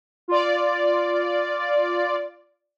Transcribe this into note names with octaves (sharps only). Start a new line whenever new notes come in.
F4 D5